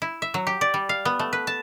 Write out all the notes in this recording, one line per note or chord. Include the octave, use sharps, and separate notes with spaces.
E4
E5
F#3
G4
D5
G3
F5
B3
A3
B4
A5